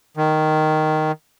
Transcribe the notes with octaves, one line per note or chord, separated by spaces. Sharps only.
D#3